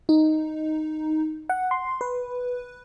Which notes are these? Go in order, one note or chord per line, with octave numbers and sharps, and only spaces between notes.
D#4
F#5
C6
B4